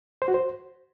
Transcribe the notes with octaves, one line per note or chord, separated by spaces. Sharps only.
C5
F#4
C5